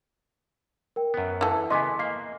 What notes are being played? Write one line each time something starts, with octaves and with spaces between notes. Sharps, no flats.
A#4 G5
F#2 B3
E3 A3
C#3 B3 D#5 G#5 C6 D6 B6
A#3 F5 C7